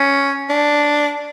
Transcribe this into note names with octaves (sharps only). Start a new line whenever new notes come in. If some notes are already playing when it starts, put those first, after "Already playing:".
Already playing: C#4
D4